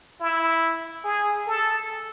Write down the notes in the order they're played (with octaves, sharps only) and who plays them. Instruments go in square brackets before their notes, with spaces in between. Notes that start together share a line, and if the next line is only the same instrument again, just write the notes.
[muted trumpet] E4
G#4
A4